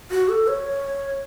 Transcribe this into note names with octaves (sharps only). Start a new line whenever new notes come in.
F#4
A4
C#5